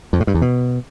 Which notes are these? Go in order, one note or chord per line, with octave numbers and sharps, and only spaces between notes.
F2
A2
G2
E2
B2